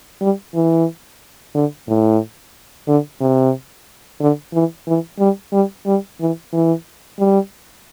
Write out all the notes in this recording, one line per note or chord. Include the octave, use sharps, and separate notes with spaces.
G3
E3
D3
A2
D3
C3
D3
E3
E3
G3
G3
G3
E3
E3
G3